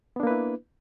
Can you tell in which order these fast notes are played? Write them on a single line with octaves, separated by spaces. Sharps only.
B3 D4 A#3 B4 E4